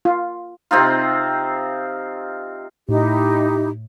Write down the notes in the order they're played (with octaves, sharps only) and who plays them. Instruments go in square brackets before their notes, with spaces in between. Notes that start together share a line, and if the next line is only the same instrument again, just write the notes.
[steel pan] F4
[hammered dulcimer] C3 C4 D#4 F4
[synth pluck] A2 [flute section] D#4 E4 G4